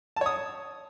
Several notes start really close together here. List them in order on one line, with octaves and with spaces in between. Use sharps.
A5 C#5 D#6